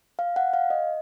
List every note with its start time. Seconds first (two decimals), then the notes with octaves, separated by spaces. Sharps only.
0.19 F5
0.36 F#5
0.53 F5
0.70 D#5